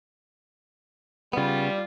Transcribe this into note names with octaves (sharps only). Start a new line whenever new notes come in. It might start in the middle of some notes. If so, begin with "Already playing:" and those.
C#3 G3 B3 F4